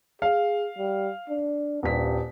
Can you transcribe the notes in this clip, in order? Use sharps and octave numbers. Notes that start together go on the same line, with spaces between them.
G#4 F5
G3
D4
D#1 G2 B6